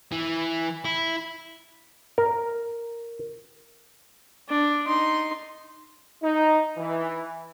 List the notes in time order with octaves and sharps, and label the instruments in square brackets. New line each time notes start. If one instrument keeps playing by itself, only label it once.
[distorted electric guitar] E3
E4
[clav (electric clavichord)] A#4
[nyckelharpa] D4
D#4 C6
[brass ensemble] D#4
E3